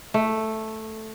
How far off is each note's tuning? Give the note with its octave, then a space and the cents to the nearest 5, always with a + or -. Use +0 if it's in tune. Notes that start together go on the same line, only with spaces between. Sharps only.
A3 +0